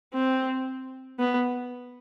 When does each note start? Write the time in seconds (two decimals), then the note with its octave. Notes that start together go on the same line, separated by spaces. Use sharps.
0.14 C4
1.20 B3